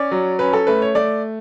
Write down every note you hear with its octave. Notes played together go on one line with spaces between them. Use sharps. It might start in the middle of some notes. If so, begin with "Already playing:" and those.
Already playing: C#4 D5
F#3
C#4 B4
A4
A3 B4
C#5
A3 D5